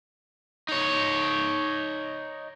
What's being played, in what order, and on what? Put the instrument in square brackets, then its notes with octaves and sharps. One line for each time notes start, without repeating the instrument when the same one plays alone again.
[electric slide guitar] D#4 C#5